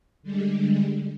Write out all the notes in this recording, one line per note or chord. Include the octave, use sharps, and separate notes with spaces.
D3 G3 G#3